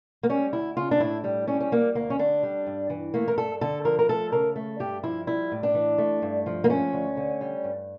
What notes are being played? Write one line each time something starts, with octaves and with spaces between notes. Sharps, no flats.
A#3
G3 C#4
D2 E4
C#3 F4
D4
A2 E4
G3
G3 C#4
C#4
G3 A#3
D2 A#3
C#4
D3 D4
G3
G2
E3
A3 A#3
A#4
G2 A4
D3 A4
F3 A#4
A#4
A3 A4
C#3 A#4
A3
G2 G4
F3 E4
G3 E4
A2
D4
E3
A3
G2
F3
A#3
A3 C#4
D2
D3
G3
G2